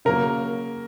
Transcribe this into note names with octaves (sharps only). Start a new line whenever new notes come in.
C#3 F#3 A#3 A#4